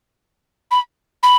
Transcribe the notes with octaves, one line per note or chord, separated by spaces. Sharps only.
B5
B5